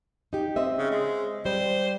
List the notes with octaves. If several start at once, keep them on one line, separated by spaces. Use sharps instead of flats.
D#4 G4
C4 D#5 E5
C#3
G#3
G3 C5